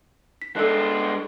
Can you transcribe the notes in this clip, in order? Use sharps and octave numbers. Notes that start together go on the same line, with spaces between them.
B6
G#3 D4 A4 F#6